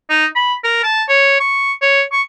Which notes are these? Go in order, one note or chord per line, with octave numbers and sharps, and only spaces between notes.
D#4
B5
A#4
A5
C#5
C#6
C#5
C#6